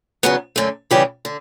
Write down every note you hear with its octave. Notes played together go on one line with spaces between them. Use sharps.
E2 C#3 F#3 B3
F#2 D3 A3
C#3 E3 G3 C#4 G4
D3